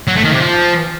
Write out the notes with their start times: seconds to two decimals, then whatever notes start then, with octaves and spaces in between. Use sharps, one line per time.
0.08 F#3
0.16 A3
0.24 D#3
0.32 C3
0.40 F3